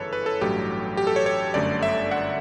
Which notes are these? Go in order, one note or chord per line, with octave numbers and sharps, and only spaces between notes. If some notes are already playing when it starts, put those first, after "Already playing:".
Already playing: G1 F#2 C#3 E3 A4 B4 C#5
B4
A4
A1 G2 F#3 A3 G4
G4
A4
C#5
C#5
G1 F#2 D3 A3 D5
E5
F#5